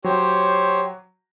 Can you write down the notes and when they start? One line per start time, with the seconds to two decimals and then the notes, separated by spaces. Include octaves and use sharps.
0.04 F#3 G4 C5 C#5